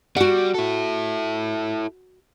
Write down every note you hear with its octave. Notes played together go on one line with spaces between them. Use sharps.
G3 F#4 F#5
E4 A4